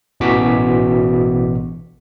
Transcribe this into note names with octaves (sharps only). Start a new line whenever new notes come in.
A1 B2 E3 F#4 D6 B6